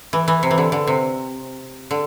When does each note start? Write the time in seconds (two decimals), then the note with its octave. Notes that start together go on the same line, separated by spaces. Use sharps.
0.13 E3
0.28 E3
0.43 C3
0.51 E3
0.58 D3
0.72 D3
0.87 C3
1.91 D3